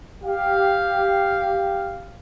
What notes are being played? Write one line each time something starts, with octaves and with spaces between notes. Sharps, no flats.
G4 F5